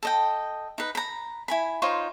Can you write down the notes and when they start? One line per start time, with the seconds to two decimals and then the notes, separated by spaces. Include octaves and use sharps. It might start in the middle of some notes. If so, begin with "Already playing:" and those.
0.03 A4 D#5 G5
0.78 D#4 B4
0.95 A#5 B5
1.48 E4 G#5 B5
1.82 D#4 F4 C5 C#5